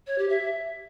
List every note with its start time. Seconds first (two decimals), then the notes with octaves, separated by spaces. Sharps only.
0.07 C#5
0.18 G4
0.29 E5